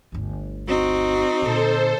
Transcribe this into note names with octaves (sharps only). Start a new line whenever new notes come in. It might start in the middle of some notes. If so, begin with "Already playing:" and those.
G1 D2
C4 D#4 F#4
A#2 D3 A4 C5